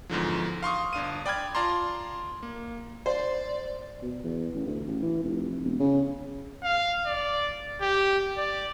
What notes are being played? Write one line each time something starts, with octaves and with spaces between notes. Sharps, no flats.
E2 G#2 D3 F3
F5 C6 C#6 D#6
G1 D4 F5 D#7
D5 G5 B5 F6 G#6
F4 D5 A5 A#5 C6
A#3
C5 D5
B2
E2
A1
D2
A1
E3
F1
E1
C#3
F5
D5
G4
D5